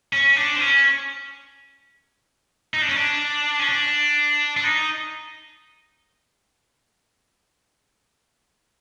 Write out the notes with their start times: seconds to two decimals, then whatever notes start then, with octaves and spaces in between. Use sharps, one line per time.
0.13 C#4
0.36 D4
0.56 C4
0.60 C#4
2.74 D#4
2.82 D4
2.89 C#4
2.96 D4
3.59 C#4
3.68 D4
4.57 D4
4.64 D#4